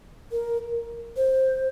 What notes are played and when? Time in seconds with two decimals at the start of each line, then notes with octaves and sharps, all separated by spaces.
0.32 A#4
1.16 C5